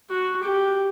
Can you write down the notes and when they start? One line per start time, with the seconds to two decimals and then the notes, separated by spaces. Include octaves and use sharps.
0.10 F#4
0.43 G4